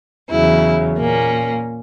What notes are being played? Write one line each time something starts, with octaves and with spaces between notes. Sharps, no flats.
E2 C#3 F#3 E4
A#2 A#3 C#4